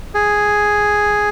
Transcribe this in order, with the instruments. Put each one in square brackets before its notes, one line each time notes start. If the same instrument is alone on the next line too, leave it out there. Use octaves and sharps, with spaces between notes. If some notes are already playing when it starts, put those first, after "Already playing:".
[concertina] G#4